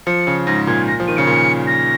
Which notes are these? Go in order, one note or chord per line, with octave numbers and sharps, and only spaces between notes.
F3 C#7
C#3
G#2 A#6
A#2 G#6
A#6
F3
D#3 D#7
C#3 C#7
A#2
A#6